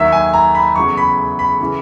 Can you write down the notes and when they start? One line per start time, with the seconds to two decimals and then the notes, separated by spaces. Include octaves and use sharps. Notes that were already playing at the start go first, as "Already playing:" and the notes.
Already playing: D#2 D#3 F#3 E5
0.12 G#5
0.34 A#5
0.55 B5
0.76 E2 C#3 F#3 C#6
0.97 B5
1.39 B5
1.60 C#3 E3